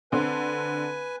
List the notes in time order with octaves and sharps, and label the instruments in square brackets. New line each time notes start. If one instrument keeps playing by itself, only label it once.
[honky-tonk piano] D3 C4 [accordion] B4 G#5